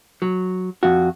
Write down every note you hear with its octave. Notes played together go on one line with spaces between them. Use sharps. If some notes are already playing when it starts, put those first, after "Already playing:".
F#3
F2 F#4